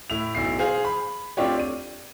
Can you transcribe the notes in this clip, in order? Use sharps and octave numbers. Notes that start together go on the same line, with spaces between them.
A2 E4 F7
B1 E4 C7
G#4 C5 F5
B5
A3 C4 D4 F4 G4 C#5
D#7